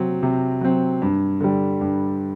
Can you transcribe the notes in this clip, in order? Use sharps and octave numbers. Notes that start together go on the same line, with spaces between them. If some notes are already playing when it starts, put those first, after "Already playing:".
Already playing: C3 F#3 C4
C3
F#3 C4
G2
D3 G3
G2